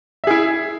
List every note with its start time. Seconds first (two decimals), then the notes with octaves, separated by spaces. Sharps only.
0.24 E5
0.27 G#4
0.31 E4